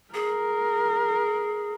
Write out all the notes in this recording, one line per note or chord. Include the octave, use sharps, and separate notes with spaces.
G#4 A#4